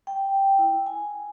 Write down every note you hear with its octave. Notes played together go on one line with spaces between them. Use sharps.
G5
E4
G#5